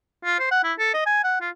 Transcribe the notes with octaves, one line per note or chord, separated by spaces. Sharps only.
F4
C5
F#5
E4
A4
D#5
G#5
F#5
F4